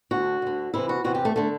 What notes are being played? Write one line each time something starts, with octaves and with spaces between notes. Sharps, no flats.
D2 D3 F#4
D2 D3
E2 C3 E3 E4
F#4
E2 C3 E3 F#4
G4
A3
D3 A3